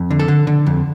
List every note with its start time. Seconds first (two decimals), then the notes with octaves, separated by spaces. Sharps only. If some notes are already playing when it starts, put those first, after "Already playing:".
Already playing: F2
0.10 D3
0.19 A4
0.28 D3
0.47 D3
0.66 F2